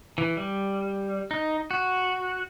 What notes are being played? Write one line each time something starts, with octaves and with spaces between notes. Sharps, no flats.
E3
G3
D#4
F#4